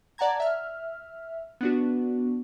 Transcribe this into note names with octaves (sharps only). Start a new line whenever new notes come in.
D5 F#5 A5 A#5 G#6
E5 F6
B3 D4 F#4